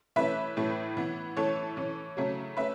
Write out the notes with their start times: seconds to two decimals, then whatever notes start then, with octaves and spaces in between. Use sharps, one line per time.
0.16 E3 A3 C#4 B4 E5
0.57 A2 E3 A3 C#4
0.97 E3 B3
1.37 E3 A3 C#4 A4 C#5
1.77 E3 C#4
2.17 C#3 F#3 A3 C#4
2.57 A3 C#4 B4 E5